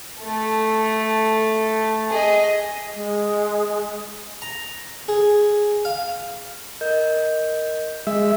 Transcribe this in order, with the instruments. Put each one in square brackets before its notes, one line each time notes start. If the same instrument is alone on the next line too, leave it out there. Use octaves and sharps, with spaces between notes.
[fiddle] A3 A4
G#4 D#5
[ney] G#3
[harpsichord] A#5
G#4
F5
[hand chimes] A#4 D#5 G6
[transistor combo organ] G#3 E5